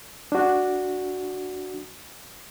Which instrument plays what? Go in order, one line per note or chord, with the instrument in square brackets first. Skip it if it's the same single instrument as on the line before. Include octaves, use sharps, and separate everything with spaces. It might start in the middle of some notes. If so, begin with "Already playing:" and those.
[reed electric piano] D4 F#4